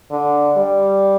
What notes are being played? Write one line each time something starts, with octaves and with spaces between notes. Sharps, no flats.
D3
G3